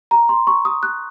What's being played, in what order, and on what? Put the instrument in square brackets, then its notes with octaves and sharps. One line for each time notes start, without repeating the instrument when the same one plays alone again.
[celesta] A#5
C6
C#6
D#6
F#6